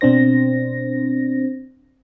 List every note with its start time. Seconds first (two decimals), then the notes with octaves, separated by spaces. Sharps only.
0.01 B2 C4 D4 C5 A#6